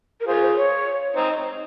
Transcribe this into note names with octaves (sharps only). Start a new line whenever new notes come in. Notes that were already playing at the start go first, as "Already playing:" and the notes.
A#4
F4 G#4 C5
C5
C#5
C4 D#4